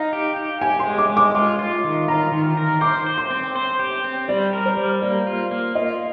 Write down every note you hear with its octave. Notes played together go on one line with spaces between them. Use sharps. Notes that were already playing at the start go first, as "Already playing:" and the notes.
Already playing: D#4 F5
G4
G4
G4 G#5
C6
G#3
D6
G#3
D6
F4 D6
F4
D#3
F4 A#5
D#3
A#4
C5 D6
C5
C6
C4
C5
G4
C4
G3 D5
A#4
C5
G3
A#3 D5
F4
A#3
F4 D#5